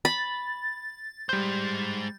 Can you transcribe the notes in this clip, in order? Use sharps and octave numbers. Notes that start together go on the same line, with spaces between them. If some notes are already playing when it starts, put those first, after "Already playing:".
B5 A6
G3 G#3 C5 G6